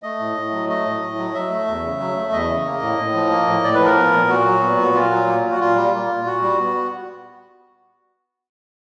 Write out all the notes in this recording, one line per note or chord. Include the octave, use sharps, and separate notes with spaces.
A3 D#5
A2
A2
F#3
A3 D#5
A2
A2
F#3
F#3 E5
A3
E2
C#3
F#3
A3
E2 D#5
C#3
A#3
A2
A2
F3
A#3
A2
A2 D5
B4
F3
A#4
B3
A#2
A#2 F#4
F#3
B3
A#2
A#2 F4
F#3
A#3
A#2
F#4
A#2 F4
G3
A#3
A#2
A#2 F#4
G3
B3